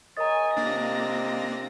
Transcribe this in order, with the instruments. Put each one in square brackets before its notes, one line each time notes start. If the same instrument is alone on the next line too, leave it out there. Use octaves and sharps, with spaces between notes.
[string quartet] G#4 C#5 G#5 [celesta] A#4 D#5 D#6 [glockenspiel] A#5 A6
[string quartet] C3 F4 A#6 [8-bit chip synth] A#3 D4 [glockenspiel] A6